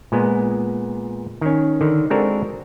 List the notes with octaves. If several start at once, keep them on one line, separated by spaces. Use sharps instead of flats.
A#2 G#3 B3
D#3 C#4
D3 D#3
G#3 C4 D4 F#4 A4 A#4